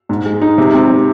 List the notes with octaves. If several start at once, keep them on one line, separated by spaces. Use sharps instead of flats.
G#2
G#3
D#4
C3
C4
C3